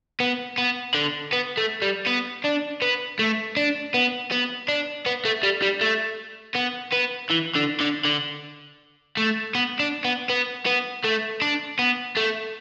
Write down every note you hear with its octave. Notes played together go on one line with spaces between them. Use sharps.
B3
B3
D3
B3
A3
G3
B3
D4
B3
A3
D4
B3
B3
D4
B3
A3
G3
G3
A3
B3
B3
E3
D3
D3
D3
A3
B3
D4
B3
B3
B3
A3
D4
B3
A3